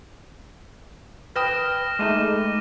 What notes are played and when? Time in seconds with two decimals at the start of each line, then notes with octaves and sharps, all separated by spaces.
1.36 B4 G5 D#6 F6 A#6 E7
1.99 G#3 A3 D#4 D6 D#7 E7